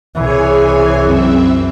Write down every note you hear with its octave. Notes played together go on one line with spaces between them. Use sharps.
C2 E3 G#4 C#5 G#5
F#2 C4 E5